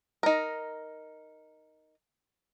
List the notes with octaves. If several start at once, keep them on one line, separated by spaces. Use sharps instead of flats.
D#4 A#4